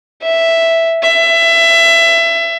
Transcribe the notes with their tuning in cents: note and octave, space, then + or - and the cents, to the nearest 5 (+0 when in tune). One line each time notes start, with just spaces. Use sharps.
E5 +0
E5 +20